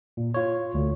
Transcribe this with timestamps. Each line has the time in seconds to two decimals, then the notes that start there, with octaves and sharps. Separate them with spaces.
0.17 A#2
0.34 F4 C#5
0.74 D2